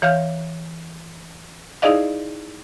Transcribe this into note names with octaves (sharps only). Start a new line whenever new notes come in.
E3 C#5 F5 F6 G6
D#4 E4 G#4 D5 D#5 F5